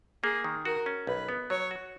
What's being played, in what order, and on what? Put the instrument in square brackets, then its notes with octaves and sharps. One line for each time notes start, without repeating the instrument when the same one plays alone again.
[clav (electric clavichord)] A#3 [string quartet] G#4
[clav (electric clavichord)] D#3
[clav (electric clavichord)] F#4 [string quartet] A#4
[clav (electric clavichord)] C#4
[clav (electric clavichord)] B1 [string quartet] B4
[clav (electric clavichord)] B3
[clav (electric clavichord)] F#3 [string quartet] C#5
[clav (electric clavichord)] F#4